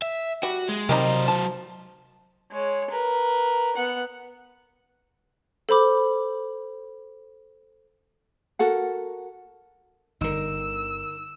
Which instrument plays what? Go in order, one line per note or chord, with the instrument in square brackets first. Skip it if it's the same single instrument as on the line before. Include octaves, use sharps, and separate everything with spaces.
[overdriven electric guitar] E5
[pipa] G3 [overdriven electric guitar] F#4
[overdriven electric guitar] G#3
[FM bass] C3 [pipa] D#3 G3 D#4 [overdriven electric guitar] F#3 C5
[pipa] A5
[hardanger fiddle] G#3 C#5
A#4 B4
B3 F#5
[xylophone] A4 C5 B5 D6
[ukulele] F#4 A4 A#4 F#5
[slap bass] G1 D3 [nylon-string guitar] D#4 A#4 [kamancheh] E6